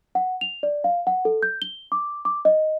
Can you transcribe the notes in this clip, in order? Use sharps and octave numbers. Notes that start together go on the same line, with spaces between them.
F#5
F7
D5
F5
F#5
A4
G6
G7
D6
D6
D#5